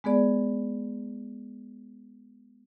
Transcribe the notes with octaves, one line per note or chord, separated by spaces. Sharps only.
G#3 B3 G#4 D5